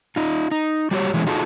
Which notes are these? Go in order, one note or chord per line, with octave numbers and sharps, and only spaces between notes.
D#4 F4
D#4
G3 F#4 G4 C#5
E3 G#3 A3 C#4
D#4 F4 F#4 G#4 A4